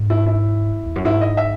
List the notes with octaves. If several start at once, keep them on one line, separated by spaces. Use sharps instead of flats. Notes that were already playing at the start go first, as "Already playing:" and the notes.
Already playing: G#2
E4
E4
E2
F#2
G#2 E4
D#5
E5